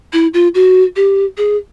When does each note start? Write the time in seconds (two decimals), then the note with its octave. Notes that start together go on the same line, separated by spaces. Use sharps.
0.13 E4
0.34 F4
0.55 F#4
0.96 G4
1.37 G#4